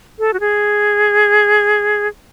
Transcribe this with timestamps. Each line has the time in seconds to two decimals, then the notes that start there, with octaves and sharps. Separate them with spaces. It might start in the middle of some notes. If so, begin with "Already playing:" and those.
0.19 A4
0.33 F#4
0.40 G#4